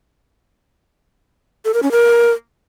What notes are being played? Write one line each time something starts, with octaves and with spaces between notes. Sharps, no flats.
A4
A#4
C#4
A#4